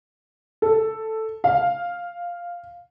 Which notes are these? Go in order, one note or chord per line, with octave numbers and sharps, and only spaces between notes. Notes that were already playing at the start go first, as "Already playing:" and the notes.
A4
F5